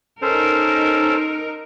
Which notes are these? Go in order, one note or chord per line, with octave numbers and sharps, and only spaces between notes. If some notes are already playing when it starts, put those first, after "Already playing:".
C#4 D#4 A4 A#4 C5